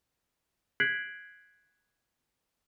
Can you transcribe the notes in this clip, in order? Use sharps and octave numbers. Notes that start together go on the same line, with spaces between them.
F#6 G#6 B6 C7 D7 F#7